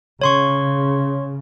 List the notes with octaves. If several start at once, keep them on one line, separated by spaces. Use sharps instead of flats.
C#3 C#5 C6 C#6